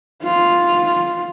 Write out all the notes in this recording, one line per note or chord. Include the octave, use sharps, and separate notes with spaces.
F4